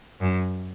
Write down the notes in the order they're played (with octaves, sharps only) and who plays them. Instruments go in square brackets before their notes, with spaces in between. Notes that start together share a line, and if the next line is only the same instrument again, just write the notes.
[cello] F#2